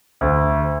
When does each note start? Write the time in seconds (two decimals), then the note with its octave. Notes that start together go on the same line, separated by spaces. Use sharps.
0.21 D2